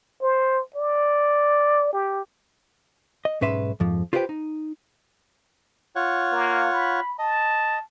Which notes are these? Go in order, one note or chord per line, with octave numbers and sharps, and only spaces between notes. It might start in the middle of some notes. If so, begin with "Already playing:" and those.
C5
D5
G4
D#5
B1 G#2 C#4 B4 E5 C6
F2 G#2 F3
F4 G4 B4 C5 D5 G5
D#4
F4 C#5 F#5
A#3
B5
D#5 A5